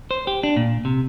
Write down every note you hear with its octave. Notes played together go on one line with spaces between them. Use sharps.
C5
G4
D4
A#2
C3